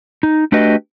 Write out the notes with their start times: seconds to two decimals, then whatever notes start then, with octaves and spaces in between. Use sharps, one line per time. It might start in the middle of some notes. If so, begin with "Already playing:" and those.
0.23 D#4
0.52 A3 D4 F#4 G4 B4 D#5